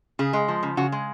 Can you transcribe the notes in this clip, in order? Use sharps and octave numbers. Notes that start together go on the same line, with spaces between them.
C#3 G#4
G#3
F3
C#3
C#3 F#4
G#3